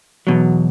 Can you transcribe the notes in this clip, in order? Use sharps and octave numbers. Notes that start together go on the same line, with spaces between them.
E2 B2 F#3